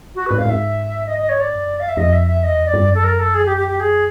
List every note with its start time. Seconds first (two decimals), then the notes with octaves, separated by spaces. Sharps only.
0.15 F#4
0.26 G#2 B4
0.38 F5
0.45 G#2 E5
1.06 D#5
1.18 D#5
1.29 C#5
1.40 D5
1.52 F#2
1.80 F5
1.89 E5
1.97 F2 D#5
2.13 E5
2.28 E5
2.43 E2 D#5
2.58 F2
2.66 D5
2.74 G2
2.88 F#2
2.95 A4
3.04 A#4
3.19 A4
3.34 G#4
3.46 G4
3.57 G4
3.68 G4
3.80 G#4